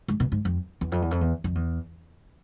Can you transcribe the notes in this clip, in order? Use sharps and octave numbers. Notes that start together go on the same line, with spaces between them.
G#2
B2
G#2
F2
E2
F2
E2
F2
E2
F2
E2